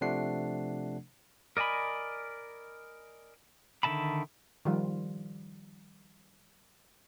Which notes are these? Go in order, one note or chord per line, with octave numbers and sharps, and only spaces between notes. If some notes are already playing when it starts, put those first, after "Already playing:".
C3 F3 A3 D4 F#5 C7
A#4 D5 D#5 G#5 B5
D3 D#3 E5 A5 B5
D#3 F3 G3 F4